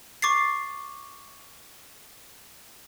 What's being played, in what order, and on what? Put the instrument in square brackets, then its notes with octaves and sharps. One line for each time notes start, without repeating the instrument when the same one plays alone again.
[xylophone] C#6 D6 A6 C7